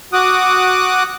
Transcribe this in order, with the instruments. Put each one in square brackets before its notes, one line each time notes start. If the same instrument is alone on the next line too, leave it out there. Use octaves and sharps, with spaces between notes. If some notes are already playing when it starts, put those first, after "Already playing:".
[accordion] F#4 D6 D#6 F#6